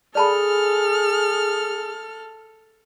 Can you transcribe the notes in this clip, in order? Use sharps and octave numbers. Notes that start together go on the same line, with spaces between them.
G#4 A4 D5 A5 B5 F6